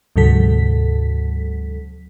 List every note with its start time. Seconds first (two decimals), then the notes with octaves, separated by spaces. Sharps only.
0.16 D2 G#2 C3 F#3 A4 B6